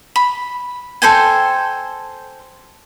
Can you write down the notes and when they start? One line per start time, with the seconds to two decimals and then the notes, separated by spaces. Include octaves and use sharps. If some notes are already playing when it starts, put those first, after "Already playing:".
0.16 B5
1.02 A4 C5 G5 G#5